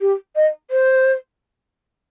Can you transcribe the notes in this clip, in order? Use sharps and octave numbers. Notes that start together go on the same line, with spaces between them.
G4
D#5
C5